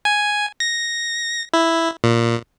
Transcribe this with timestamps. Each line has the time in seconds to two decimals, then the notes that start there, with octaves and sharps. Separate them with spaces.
0.05 G#5
0.60 A#6
1.54 E4
2.04 A#2